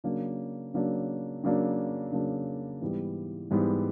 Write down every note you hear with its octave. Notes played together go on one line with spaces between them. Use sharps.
C#3 F#3 A#3 D4
C#3 F#3 A#3 D4
C#3 F#3 A#3 D4
C#3 F#3 A#3 D4
G#2 E3 G3 B3
G#2 E3 G3 B3